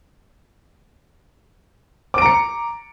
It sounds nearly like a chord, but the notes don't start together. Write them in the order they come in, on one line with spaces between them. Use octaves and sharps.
D6 D7 A#5 C#7